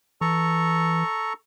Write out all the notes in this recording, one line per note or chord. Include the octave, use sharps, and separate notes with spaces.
E3 A4 A#5 C#6